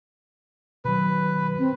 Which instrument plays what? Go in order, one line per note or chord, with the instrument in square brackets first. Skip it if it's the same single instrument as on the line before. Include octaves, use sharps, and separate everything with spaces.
[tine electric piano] B2 D#3 F#3 [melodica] B4
[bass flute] C4